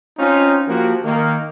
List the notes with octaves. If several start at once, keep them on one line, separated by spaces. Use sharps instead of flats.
C4 C#4 D#4 F4
F3 A#3 F#4 G4
D#3 A#3